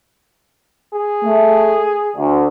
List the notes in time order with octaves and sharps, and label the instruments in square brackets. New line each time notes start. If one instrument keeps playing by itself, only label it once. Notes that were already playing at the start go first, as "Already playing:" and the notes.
[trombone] G#4
[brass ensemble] A3
D2